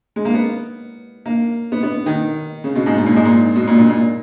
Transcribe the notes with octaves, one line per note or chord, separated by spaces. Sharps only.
G#3
A#3
B3
A#3
B3
B3
D#3
C#3
B2
G#2
B2
A#2
G#2
A#2
B2
A#2
A#2
A#2